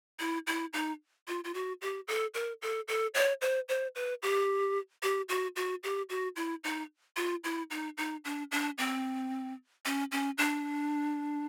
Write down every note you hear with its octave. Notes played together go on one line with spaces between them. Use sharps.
E4
E4
D#4
F4
F4
F#4
G4
A4
A#4
A4
A4
C#5
C5
C5
B4
G4
G4
F#4
F#4
G4
F#4
E4
D#4
F4
E4
D#4
D#4
D4
D4
C4
C#4
C#4
D4